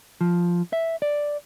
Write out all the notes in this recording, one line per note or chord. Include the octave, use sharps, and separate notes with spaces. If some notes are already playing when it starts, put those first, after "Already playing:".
F3
E5
D5